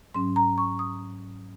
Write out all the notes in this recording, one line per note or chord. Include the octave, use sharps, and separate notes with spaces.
G#2 F#3 C#4 C6
A#5
C#6
D#6